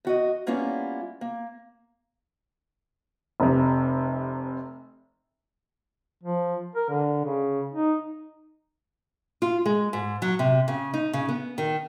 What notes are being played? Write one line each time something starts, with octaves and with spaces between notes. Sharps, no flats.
E2 F#4 D#5
G3 A#3 B3 C#4 E4 F4
A#3
F1 C3
F3
A#4
D3
C#3
D#4
F4
G#3
G#2
F#3
C3
C#3
D#4
C#3
B3
D#3